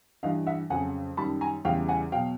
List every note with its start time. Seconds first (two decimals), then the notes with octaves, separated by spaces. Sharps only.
0.23 G2 E3 G3 D#5 F5
0.46 E5 F#5
0.70 F2 C#3 F#3 F#5 G#5
1.17 F#2 D#3 G3 A5 B5
1.41 G#5 A#5
1.65 E2 C#3 E3 G3 F5 G5
1.89 F#5 G#5
2.12 B2 F#3 F5 G5